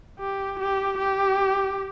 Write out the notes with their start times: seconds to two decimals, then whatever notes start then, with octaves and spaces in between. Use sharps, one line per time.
0.19 G4
0.59 G4
0.98 G4